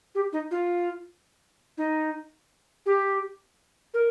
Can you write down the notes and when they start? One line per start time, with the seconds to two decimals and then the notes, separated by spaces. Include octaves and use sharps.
0.15 G4
0.33 D#4
0.51 F4
1.78 D#4
2.86 G4
3.94 A#4